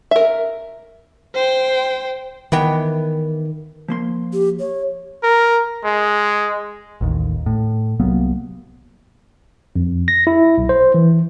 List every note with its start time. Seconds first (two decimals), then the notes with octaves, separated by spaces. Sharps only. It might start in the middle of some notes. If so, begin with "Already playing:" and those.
0.11 A#4 E5
1.35 C5 G5
2.52 D#3 E3 B3 G5
3.88 F3 A#3 C6
4.33 G4
4.59 C#5
5.23 A#4
5.85 G#3
7.01 A1 D#2
7.46 A2
8.00 C2 F#3 A#3 B3
9.76 F2
10.08 A#6
10.27 E4
10.58 B1
10.69 C5
10.94 E3